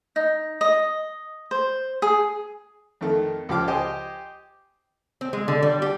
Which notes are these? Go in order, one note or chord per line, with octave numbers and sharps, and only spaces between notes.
D#4
D#5
C5
G#4
F2 D#3 A3
C#2 F3 G4 F5 D6
G4 C5 D#5 G#5
C4
G#3
D3
G3
G4